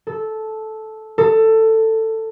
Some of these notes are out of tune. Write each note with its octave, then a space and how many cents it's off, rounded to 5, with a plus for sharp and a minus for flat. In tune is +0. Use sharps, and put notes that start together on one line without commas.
A4 -10
A4 +15